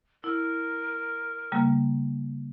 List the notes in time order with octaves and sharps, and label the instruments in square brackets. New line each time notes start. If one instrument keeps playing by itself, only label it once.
[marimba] E4 [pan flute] A#4
[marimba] C#3 G3 A#3